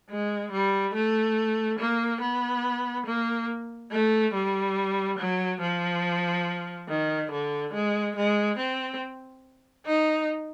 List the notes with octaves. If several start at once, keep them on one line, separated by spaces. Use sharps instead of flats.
G#3
G3
A3
A#3
B3
A#3
A3
G3
F#3
F3
D#3
D3
G#3
G#3
C4
D#4